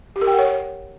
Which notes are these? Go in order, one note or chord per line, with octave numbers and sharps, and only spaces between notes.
G4
A#4
G5
F#5
C#5